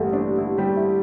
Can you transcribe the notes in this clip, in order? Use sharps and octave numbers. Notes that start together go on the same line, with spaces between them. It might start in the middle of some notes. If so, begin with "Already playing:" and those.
Already playing: A1 G2 G3 A3 A4
D4
E4
G3 G4
E4